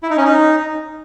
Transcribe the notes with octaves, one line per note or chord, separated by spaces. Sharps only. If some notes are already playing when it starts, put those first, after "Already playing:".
E4
D#4
C#4
D#4